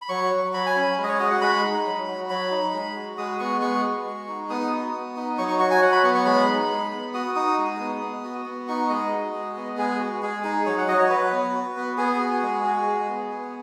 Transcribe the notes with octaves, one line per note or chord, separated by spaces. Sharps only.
B5
F#3 C#6
F#4
F#3 B5
G#5
C#4 B5
G#3
D#5
C#5
F#4 D#5
F#5
G#3 B5
D#4
F#3
F#4
F#3 B5
D#4
G#3
F#4
G#3 D#6
B3 C#6
G#3 C#6
F#4
G#3
D#4
B3 D#6
F#4
B3
D#4
F#3 C#6
C#6
F#4 C#6
G#5
F#3 F#5
B5
B3 C#6
C#6
G#3 B5
D#4
G#3
B3
F#4 D#6
D#4 D#6
G#3
B3
B3
F#4
B3
D#4 C#6
G#3 D#5
F#4
G#3
B3
G#3 G#4
F#4
G#3 G#4
D#4 G#4
F#3 C#5
F#5
F#4 D#5
C#5
F#3 B4
B3
F#4
B3
B3 G#4
F#4
G#3
F#4
G#3
B3
B3